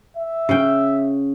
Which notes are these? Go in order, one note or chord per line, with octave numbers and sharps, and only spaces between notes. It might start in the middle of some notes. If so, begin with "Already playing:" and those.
E5
C#3 G5